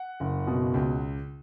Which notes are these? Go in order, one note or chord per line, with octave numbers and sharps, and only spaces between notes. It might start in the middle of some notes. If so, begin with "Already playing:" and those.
Already playing: F#5
F#1
B2
C#2